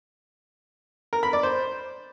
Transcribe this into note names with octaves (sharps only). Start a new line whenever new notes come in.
A#4
B5
D5
C5